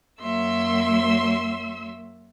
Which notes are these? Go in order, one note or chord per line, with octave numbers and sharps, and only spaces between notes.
F#2 F#3 A#3 E5 C6 E6